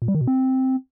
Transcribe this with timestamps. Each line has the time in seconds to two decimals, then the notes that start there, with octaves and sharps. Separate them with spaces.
0.02 A#2
0.08 G3
0.15 D#3
0.21 B2
0.27 C4